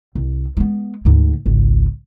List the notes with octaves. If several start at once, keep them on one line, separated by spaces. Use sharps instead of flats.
C2
G#3 B3
D2 G#2
G#1 C#2